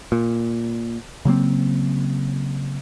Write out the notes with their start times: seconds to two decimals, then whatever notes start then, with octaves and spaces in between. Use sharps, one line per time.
0.12 A#2
1.25 C#3 F#3 A#3 C4